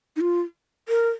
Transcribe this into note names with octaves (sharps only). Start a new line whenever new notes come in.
D#4
F4
A#4